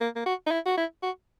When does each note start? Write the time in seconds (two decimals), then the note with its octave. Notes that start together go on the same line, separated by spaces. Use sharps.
0.01 A#3
0.16 A#3
0.26 F#4
0.47 D#4
0.51 E4
0.66 F#4
0.77 E4
1.03 F#4